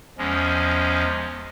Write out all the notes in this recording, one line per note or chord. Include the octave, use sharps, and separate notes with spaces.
E2 F3 G#3 C#4